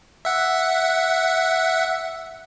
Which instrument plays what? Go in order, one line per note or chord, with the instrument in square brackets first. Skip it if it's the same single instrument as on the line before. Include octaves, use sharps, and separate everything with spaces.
[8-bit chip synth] E5 F#5